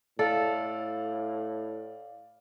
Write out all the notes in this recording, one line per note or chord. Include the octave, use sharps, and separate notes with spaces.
A2 A4 D5 F5